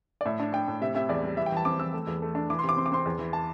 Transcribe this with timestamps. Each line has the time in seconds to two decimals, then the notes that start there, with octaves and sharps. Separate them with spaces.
0.21 D5
0.25 A2 E5
0.40 D4
0.53 D4 G5
0.68 A2
0.81 C3 E5
0.95 C3 E5
1.09 E2 D5
1.23 G3
1.37 E3 E5
1.46 G5
1.52 E3 A5
1.65 C4 D6
1.79 E3 E6
1.94 A3
2.07 E2
2.22 A3
2.35 D4
2.50 E3 D6
2.59 C6
2.64 C3
2.69 D6
2.77 C4 C6
2.86 D6
2.92 C4 C6
3.06 E2
3.19 E3
3.33 A5